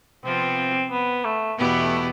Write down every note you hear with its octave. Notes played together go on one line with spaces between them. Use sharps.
C3 F3 B3 C4 F4
B3
A3
E2 B2 B3 E4 G4
A3